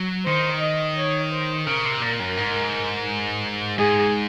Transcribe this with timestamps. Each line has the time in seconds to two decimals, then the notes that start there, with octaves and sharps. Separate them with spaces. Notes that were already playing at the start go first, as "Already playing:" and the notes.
Already playing: F#3
0.25 D#3 C5
0.61 D#5
0.97 C#5
1.32 C5
1.66 C#3 A#4
1.85 C3
2.01 A#2
2.19 F#2
2.37 G#2
3.78 G#2 G#4